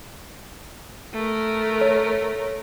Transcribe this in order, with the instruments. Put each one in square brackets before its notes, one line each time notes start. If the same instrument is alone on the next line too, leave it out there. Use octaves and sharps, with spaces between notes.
[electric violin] A3 A#4
[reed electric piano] C#5